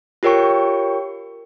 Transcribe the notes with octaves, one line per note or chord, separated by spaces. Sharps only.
F4 G4 A#4 C#5 G5 C#6